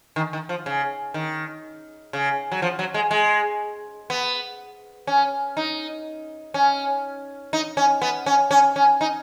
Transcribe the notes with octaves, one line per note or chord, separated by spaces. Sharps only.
D#3
D#3
F3
C#3
D#3
C#3
F#3
F3
F#3
G#3
G#3
B3
C#4
D#4
C#4
D#4
C#4
B3
C#4
C#4
C#4
D#4